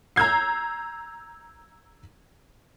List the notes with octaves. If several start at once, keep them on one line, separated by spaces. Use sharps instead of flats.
A#5 E6 G6 G#6 C7